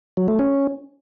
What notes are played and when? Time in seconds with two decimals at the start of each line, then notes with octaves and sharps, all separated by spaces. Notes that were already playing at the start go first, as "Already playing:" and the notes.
0.17 F#3
0.28 A3
0.39 C#4